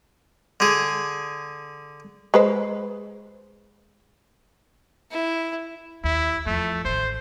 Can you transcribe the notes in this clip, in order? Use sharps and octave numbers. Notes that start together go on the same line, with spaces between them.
D3 G#4
G#3 B4 C5
E4
D#2 E4
E2 F3 A3
A1 D#3 C5